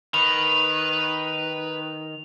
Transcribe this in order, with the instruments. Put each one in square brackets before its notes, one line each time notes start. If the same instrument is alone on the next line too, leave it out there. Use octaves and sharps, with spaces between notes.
[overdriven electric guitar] D#3 [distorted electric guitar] B4 B5 [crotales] F7